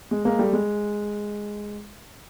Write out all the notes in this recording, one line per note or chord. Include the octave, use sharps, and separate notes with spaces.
G#3
G#3 A#3
G3 A3
G#3